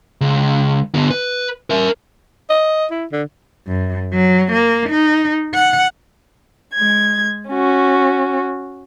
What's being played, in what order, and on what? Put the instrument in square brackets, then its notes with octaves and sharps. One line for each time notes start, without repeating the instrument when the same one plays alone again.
[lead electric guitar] C#2
D3 B3
B4
A#4 E5
[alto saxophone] D#5
E4
D3
[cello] F#2
F#3
A#3
D#4
F#5
[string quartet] G#3 G#6
C#4 F#4